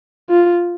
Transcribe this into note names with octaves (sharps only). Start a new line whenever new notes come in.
F4